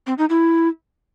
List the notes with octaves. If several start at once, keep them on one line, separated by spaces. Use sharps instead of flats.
C4
D#4
E4